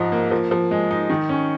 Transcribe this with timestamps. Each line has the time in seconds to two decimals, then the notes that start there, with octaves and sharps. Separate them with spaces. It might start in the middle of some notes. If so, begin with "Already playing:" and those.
Already playing: G#2 F3 D#4
0.12 A#3
0.31 F3
0.51 F3
0.71 G#3
0.91 D#4
1.10 D#3
1.29 C#4